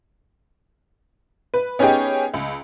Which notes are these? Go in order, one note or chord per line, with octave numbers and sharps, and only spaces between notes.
B4
B3 C#4 D#4 G4 G#4 G5
C#2